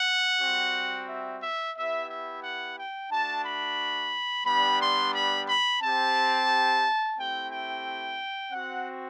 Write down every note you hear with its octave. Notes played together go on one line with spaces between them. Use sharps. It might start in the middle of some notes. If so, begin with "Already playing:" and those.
Already playing: F#5
G3 C4 F#4
E5
E5
B3 E4 G4 E5
E5
F#5
G5
A3 D4 F#4 A5
B5
G3 B3 D4 G4 B5
C6
B5
B5
C4 G4 A5
A3 C4 E4 G4 G5
G5
C4 F#4 F#5